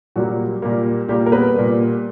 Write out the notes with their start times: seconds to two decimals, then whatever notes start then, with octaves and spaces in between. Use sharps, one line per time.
0.16 A#2 F#3 G3 A#3 F#4
0.62 A#2 G3 A#3
1.08 A#2 G3 A#3 G4
1.26 A#4
1.32 B3 B4
1.55 A#2 G3 A#3